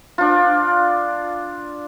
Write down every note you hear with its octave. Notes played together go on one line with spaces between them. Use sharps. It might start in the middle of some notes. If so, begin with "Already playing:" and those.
D4 F4